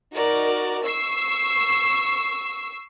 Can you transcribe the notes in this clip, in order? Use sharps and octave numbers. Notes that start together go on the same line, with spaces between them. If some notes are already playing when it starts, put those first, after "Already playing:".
D#4 F#4 A#4 D5
C#6 E6 C7